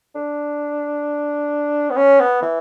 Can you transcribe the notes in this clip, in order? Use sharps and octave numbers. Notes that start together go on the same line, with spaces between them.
D4
B3
C#4
B3
E3